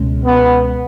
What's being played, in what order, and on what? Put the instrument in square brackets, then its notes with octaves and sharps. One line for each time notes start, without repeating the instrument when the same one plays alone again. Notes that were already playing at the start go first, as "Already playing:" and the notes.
Already playing: [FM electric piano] C#2 B2 G#3 C#4
[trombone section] B3